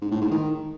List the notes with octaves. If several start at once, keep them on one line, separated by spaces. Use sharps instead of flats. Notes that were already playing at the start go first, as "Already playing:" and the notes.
G#2
A2
G#2
D#3